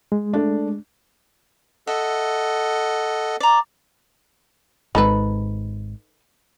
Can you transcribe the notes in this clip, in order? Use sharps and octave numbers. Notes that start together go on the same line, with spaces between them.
G#3
A3 D4
A4 D#5 E5 F#5
D5 A#5
G#1 G#2 D#4 A4 B4